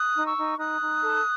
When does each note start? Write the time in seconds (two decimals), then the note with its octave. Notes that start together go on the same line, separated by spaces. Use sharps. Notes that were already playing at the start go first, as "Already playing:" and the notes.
Already playing: D#6 F#6
0.14 D#4
0.25 C#6 E6
0.36 D#4
0.58 D#4 D#6 F#6
0.81 D#4
1.02 A4